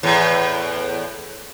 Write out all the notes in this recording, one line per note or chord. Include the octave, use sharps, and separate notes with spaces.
E2 A2